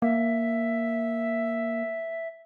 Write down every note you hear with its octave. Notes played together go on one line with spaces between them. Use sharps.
A#3 E5